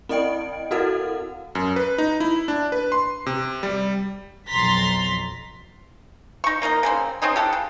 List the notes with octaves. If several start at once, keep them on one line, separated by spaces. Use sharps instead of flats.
C4 E4 D5 D#5 G5 D7
E4 F#4 A4 A#4 F5 F#5
F#2
B4
D#4
E4
D4
B4
C6
C3
G3
B1 F2 A#5 C6 A6 B6
D#4 C#6
A#3 D#4 A#4 D#5
C#3 A#3 C4
C4 C#4 D#4 G#4
G4 A4 F#5
C#3